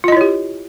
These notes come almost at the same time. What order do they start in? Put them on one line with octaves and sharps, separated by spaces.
F4 D#5 E4 C#5 G4